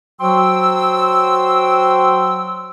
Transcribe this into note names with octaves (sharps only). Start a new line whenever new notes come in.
F#3 F#4 C5 G5 C6 E6